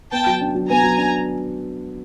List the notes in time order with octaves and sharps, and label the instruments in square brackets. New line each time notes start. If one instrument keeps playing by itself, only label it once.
[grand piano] B3 [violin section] G5 A5
[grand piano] F#3
D4
F#3
[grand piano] B3 [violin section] G#5 A#5
[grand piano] F#3
D4